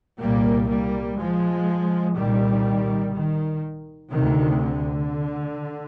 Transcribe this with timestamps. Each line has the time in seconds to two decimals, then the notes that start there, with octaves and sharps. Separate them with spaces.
0.19 C2 A#2 G3 A#3
0.68 G3 A#3
1.18 F3 G#3
2.16 C2 A#2 D#3 G3
3.14 D#3
4.12 C3 D#3
4.17 D2
4.61 D3